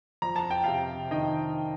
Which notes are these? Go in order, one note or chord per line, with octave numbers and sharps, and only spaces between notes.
F2 A#5
A5
G5
C3 F5 A5
D#3 D#5 G5